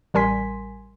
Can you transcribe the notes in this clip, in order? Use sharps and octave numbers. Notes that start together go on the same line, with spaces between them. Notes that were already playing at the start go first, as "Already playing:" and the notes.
A1 G3 A#4 G#5 C6 B6